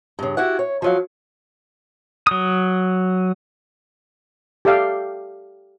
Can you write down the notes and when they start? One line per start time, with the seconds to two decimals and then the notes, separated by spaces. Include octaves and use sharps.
0.19 G2 C#3
0.37 E4 F#4 G4 F#5
0.59 C#5
0.82 F3 F#3 F5
2.27 F#3 D#6
4.65 G4 A4 D5 E5 F5 G5